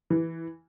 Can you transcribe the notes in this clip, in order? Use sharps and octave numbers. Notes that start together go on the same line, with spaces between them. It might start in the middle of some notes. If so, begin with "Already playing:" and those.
E3